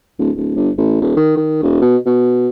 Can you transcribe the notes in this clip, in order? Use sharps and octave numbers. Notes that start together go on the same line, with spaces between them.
D1
D1
G1
A1
D#1
D#3
D#3
E1
B2
B2